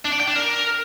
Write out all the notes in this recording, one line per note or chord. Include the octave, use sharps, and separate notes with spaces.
D4
D5
G5
D4
A#4